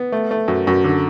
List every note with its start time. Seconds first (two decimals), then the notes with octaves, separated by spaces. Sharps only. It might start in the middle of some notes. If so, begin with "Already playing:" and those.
Already playing: B3
0.12 A3
0.31 A3
0.48 F#2
0.67 F#2
0.84 D3